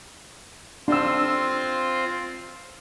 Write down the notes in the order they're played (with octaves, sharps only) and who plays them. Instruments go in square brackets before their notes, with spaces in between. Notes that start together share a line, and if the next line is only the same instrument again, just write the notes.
[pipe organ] C4 F4 C5 [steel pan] D4 E6